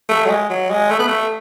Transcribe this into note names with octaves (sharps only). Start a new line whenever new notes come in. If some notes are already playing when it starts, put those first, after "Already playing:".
A3
F#3
G#3
F#3
G#3
A3
B3
A3